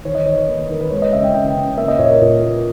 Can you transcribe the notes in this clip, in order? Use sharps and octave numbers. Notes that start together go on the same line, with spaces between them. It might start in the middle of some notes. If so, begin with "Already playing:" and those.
D#3 C#5
D#5
D#3 C#5
A#3 B4
D#3 A#4
B4
G#3 C#5
D#5
C#3 E5
G5
C#3 G5
C#3
A#3 E5
D#5
A#2 C#5
A#4
A#2 A#4
A#3